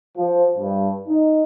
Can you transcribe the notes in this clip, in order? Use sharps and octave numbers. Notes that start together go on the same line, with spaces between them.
F3
G2
D#4